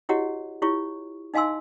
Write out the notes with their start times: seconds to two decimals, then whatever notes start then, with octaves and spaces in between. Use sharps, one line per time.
0.09 E4 F#4 G4 C#5 D#5 F#5
0.62 E4 F4 G4 C#5 C#6
1.34 D#4 D#5 F5 G#5 C6 E6